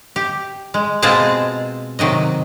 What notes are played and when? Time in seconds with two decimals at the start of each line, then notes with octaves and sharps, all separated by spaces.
0.16 G4
0.74 G#3
1.02 B2 G#3 C4 F4 G#4 A5
1.99 C3 D#3 F#3 D#5